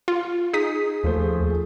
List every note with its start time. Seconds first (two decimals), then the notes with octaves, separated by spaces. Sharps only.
0.08 F4
0.53 D#4 G#4 D#6 B6
1.03 D#2 F3 A3 C5